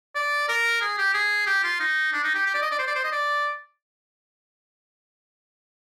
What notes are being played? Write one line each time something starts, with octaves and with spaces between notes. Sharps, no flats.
D5
A#4
G#4
G4
G#4
G4
F4
D#4
D4
D#4
G4
G4
D5
D#5
D5
C5
D5
C5
D#5
D5